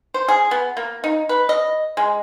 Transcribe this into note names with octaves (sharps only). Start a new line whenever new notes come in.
C5
G#4
B3
A#3
D#4
B4
D#5
G#3